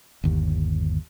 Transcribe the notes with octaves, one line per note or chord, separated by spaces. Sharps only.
G1 D#2